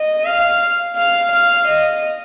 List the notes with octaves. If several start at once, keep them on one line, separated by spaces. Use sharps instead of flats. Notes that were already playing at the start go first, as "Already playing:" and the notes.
Already playing: D#5
F5
F5
F5
D#5